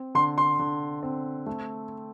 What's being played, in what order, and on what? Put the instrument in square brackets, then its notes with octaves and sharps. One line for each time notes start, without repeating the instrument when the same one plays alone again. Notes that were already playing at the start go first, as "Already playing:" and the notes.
Already playing: [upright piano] C4
[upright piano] D3 [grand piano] C6
[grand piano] C6
[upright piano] D3
C4
A3